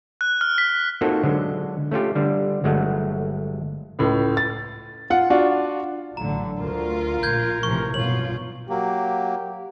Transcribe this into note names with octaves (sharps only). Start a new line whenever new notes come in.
F#6
F6
B6
A#3 C4 D#4 F4 F#4 A4
D3 F#3 G#3
A3 C#4 F4 G4
D3 G3
G1 F#3 G#3 A3 F#5
C#2 A2
A6
F4 F#5
D4 F4 F#4
A1 A2 D3 F#3 A#5
D2 F4 A#4
A#1 G6 G#6
A#1 A2 C3 E3 F3 C#6
B1 G2 B2 F4 C#5 F#7
F#3 A#3 G4